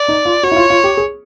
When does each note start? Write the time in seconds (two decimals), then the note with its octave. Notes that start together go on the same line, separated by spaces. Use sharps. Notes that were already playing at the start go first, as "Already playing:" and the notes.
Already playing: D5
0.08 D#4
0.25 F4
0.43 F#4 C#5
0.51 E4
0.56 F4
0.70 F4
0.84 G4
0.97 G#4